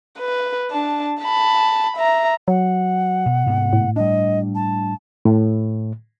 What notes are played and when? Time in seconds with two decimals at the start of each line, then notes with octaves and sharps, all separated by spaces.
0.19 B4
0.71 D4 A5
1.23 A5 B5
1.97 E5 A#5
2.48 F#3 F#5
3.26 B2
3.46 G#2 C3 B3
3.73 A2
3.96 G3 D4 D#5
4.55 A5
5.25 A2